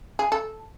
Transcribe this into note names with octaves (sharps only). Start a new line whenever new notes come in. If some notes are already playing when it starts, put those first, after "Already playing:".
G#4
A4